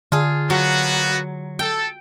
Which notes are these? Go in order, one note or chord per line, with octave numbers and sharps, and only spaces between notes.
D3 F4 G#4
F#3 A#3 B3 F#4
A4 G5